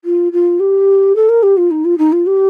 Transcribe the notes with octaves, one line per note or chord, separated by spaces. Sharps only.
F4
F4
G4
A4
A#4
G4
F4
D#4
F4
D#4
F4
G4